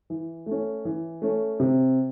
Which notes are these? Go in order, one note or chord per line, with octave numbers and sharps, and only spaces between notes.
E3
A3 C#4
E3
A3 C#4
C3